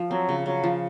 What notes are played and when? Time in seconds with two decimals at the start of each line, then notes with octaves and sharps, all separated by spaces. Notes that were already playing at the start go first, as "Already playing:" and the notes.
Already playing: F3
0.10 F#3 C4
0.29 C#3
0.46 C#3 F#3
0.64 F3